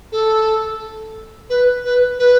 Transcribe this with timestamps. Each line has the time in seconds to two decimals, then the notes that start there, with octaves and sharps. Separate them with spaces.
0.12 A4
1.50 B4
1.85 B4
2.19 B4